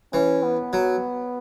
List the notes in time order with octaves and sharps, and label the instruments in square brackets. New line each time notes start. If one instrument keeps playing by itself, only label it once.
[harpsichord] E3 [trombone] C#4
[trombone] B3
[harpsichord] F#3